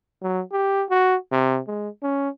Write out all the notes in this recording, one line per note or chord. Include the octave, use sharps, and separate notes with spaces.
F#3
G4
F#4
C3
G#3
C#4